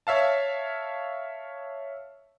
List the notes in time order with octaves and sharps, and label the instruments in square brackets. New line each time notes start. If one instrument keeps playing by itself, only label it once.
[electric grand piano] C#5 E5 F5 A5